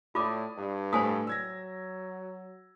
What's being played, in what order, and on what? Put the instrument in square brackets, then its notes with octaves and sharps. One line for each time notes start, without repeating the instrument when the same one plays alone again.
[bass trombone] A2 [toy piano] F4 D6 [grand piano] D5 D#6
[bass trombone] G2
[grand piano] A2 A4 B6 [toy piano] C5 G#5 D#6
[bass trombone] F#3 [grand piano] E6 G#6 A#6